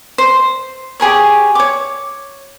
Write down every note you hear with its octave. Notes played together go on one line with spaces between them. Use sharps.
C5
G4 G#4 A#4 C#5
C#5 D6